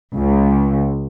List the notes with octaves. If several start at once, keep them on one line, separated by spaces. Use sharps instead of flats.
C#2